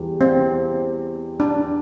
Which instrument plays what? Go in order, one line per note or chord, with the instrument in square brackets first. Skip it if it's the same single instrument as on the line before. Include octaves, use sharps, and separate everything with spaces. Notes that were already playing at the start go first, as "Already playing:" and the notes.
Already playing: [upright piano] E2 G3
[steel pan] C4
D4